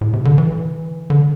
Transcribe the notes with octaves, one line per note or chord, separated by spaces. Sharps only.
A2
C3
D3
E3
D3